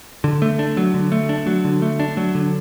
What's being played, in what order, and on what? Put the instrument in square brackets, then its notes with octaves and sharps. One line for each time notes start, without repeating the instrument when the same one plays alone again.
[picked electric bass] D3
A3
D4
F#3
D3
A3
D4
F#3
D3
A3
D4
F#3
D3